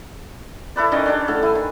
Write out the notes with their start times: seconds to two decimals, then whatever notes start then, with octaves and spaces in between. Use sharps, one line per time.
0.76 E4 A4 B4 D5
0.92 D#3 C#4 D5 D#5
1.06 C#4 D4 G4
1.28 A2 D3 A4
1.43 E4 G#5
1.55 D#3